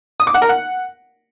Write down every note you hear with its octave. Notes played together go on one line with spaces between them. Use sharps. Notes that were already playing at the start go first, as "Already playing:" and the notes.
D#6
D6
F#5
A#4
F#5